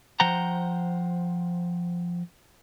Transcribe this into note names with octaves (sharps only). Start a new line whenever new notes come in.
F3 C5 F#5 G5 A#5